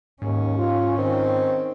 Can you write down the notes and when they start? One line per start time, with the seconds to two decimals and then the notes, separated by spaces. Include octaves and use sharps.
0.22 D#2 G#2 C#4
0.58 F4
0.98 D#3 C4